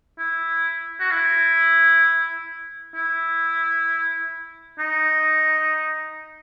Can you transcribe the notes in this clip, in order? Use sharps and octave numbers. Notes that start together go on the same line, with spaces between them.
E4
F#4
E4
E4
D#4